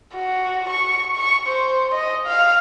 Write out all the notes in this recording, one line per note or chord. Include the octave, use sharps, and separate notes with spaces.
F#4
C#6
C#6
C5
D#5
F5